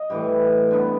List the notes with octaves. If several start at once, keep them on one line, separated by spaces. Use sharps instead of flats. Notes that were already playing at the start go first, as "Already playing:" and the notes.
Already playing: D#5
A2 E3 G3
D3 G3 B3